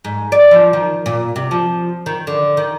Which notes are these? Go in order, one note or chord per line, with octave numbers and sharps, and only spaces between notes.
G#2
D5
F3
D#3
A#2
C3
F3
D#3
D3
D#3